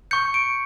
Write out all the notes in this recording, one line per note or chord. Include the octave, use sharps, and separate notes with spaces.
C#6 G6 C#7
D7